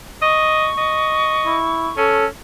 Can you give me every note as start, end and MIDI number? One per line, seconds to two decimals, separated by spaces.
0.22 0.69 75
0.22 2.15 85
0.78 1.57 75
1.45 1.90 64
1.97 2.27 61
1.97 2.26 69